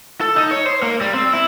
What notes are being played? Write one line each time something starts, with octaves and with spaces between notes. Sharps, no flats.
A4
D#4
C#5
C5
A#3
G3
C4
E4